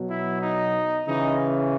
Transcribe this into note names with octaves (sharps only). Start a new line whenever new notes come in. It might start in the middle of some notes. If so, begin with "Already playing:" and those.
Already playing: B2 F#3
E4
D#4
C#3 E3 D#4